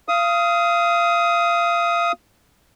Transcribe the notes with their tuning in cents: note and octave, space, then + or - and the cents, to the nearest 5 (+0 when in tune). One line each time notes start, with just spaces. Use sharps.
F5 -25 D#6 +15